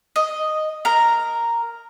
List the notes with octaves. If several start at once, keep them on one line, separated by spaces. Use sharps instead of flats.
D#5
A#4 A#5